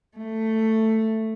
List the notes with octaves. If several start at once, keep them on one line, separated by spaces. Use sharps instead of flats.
A3